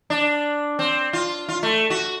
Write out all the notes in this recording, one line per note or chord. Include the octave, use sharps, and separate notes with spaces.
D4
C4
F4
F4
A3
F#4